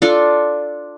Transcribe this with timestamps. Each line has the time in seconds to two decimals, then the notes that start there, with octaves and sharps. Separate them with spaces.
0.02 D4 F4 A4